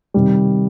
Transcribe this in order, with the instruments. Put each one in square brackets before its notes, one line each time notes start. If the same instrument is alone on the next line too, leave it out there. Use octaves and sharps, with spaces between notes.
[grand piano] C3 D#3 G3